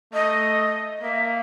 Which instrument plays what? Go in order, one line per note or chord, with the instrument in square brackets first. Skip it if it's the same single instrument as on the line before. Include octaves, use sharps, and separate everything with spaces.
[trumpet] A3 [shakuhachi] D#5
[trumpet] A#3 [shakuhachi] E5